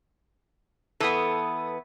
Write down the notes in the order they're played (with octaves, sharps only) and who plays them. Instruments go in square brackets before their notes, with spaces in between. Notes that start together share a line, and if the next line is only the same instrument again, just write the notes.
[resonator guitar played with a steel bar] E3 B3 [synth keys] A4 D#6